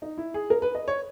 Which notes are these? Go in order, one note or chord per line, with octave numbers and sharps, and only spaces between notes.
D#4
E4
G#4
A#4
B4
D#5
C#5